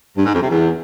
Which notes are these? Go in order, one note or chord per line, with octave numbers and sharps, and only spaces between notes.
G2
G#2
F2
C3
E2